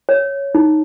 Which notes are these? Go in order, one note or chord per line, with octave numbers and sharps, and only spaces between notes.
C#5
D#4